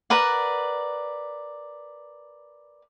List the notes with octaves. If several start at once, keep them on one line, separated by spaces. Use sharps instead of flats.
A#4 B4 D5 F#5